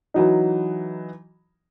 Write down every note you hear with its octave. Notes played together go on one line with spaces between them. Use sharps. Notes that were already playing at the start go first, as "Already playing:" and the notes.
E3 F#3 D#4